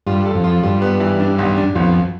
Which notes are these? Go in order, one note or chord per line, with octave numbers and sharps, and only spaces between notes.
G2 F4
A4
F2
F4
G2 F4
B3
E3
D4
B1
D4
B1 F2